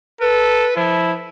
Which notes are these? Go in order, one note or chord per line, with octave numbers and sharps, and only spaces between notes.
A4 B4
F3 E4